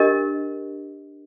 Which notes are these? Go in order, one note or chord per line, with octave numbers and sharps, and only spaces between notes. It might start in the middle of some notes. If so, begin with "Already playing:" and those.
Already playing: D4 G4 A#4 D#5